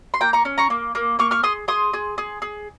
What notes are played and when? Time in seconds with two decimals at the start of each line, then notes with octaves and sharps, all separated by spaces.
0.14 C6
0.21 A#3 G5 A#5
0.33 A#5 C#6
0.45 C#4
0.58 A#5 C#6
0.70 A#3
0.95 A#3
1.19 A#3 C#6 F6
1.31 C#6 F6
1.43 G#4 C6 D#6
1.68 G#4 C6 D#6
1.93 G#4
2.18 G#4
2.42 G#4